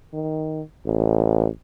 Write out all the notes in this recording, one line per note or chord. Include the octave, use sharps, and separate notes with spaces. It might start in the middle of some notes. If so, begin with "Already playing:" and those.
D#3
A1